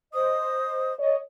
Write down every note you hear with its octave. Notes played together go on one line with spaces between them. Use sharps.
C5 D#5 D#6
C#5 D#5